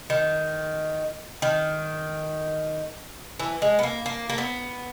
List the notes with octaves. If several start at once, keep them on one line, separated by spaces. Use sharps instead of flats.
D#3
D#3
E3
G#3
B3
A#3
A#3
A#3
B3